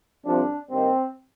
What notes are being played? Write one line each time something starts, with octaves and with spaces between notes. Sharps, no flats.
C2 C3 F3 C4 D4
G2 D#3 A#3 C4